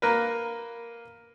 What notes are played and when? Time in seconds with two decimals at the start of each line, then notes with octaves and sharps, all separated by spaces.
0.02 A#3 A#4 B4